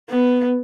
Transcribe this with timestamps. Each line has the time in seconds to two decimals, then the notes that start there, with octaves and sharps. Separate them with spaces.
0.10 B3